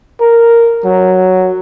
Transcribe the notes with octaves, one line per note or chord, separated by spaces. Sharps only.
A#4
F#3